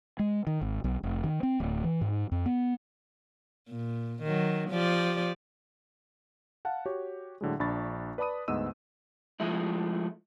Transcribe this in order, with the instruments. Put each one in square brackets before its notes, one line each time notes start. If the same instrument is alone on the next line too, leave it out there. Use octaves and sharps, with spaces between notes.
[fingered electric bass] G#3
D#3
G#1
B1
F1
D#3
C4
D1
E3
G#2
F2
B3
[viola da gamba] A#2
D#3 F#3
F3 G4 D5
[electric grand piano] F5 F#5 A5
F#4 G4 C#5
A2 D3 F#3 G#3
A#1 D4 B5 C#6 A6
B4 D5 A5 B5 D#6 D#7
D2 G#2 B3 D#5 E6 D#7
[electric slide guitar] F3 G#3 A3 E4